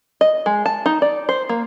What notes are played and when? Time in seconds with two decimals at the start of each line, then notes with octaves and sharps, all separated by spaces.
0.21 D#5
0.46 G#3
0.66 A5
0.86 D#4
1.02 D5
1.29 C5
1.49 A#3